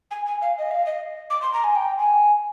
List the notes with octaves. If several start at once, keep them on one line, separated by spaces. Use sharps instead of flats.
G#5
G#5
F5
D#5
F5
D#5
D6
C6
A#5
G#5
G5
G#5